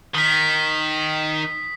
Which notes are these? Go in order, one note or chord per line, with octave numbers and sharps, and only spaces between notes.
D#3 D#6 B6